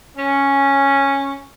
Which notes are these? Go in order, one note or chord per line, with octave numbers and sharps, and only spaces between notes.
C#4